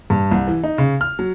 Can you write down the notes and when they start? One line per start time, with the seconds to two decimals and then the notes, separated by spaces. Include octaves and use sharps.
0.10 G2
0.31 C2
0.47 E3
0.64 D#4
0.78 C#3
1.01 F6
1.19 F#3